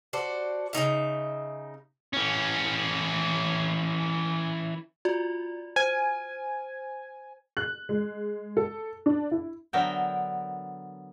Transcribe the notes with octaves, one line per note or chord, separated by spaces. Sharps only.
F#4 A4 C5 D5
C#3 C#4 D#4 E5
E3 C#4
F4 F#4 D5
C5 G#5
F#6
G#3
A4
D4
E4
D3 F#3 B3 A#4 E5 G5